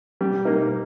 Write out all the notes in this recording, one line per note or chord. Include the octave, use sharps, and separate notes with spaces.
G3
A#3 D#4